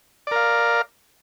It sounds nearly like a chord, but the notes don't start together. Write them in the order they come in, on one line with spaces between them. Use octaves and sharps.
D5 A#4 F5